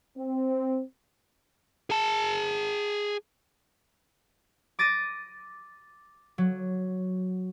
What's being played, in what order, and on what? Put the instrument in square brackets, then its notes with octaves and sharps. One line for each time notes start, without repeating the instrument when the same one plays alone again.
[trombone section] C4
[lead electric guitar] G#4 A5
[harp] D6 A6 A#6 D#7
F#3